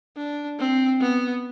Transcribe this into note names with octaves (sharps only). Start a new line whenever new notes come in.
D4
C4
B3